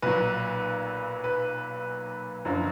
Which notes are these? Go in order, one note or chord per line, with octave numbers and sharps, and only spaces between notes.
B1 A#2 F#3 B4
B4
F#1 F#2 D3 F3